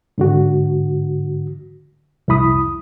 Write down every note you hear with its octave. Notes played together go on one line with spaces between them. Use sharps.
G#2 D3 F#4
C2 F2 E4 B5 D#6